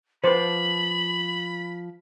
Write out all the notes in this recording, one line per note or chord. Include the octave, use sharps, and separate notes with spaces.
F3 B4 C5 A5 B5 D6 F#7